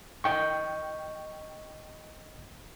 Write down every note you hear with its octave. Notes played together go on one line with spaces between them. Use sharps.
D#5 G5 C#6